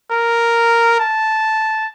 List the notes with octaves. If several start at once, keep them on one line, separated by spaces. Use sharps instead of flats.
A#4
A5